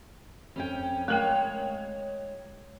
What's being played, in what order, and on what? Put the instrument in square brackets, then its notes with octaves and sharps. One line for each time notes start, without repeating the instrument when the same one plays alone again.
[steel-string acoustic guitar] F2 C#4 G5
[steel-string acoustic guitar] G#3 C#5 [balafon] A3 A#4 G5